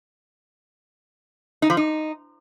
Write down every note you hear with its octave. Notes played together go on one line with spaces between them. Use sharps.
D#4
F3
D#4